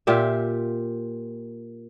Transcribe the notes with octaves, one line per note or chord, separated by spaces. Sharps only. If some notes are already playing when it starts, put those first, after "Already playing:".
A#2 F4 G4 E5